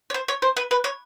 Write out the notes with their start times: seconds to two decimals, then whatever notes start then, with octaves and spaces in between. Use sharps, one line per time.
0.10 C#5
0.14 C5
0.28 C#5
0.42 C5
0.57 B4
0.71 B4
0.84 C#5